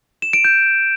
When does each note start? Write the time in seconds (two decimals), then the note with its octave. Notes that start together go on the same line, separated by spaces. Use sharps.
0.22 E7
0.33 D7
0.45 G6